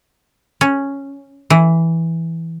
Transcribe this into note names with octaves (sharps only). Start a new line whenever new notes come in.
C#4
E3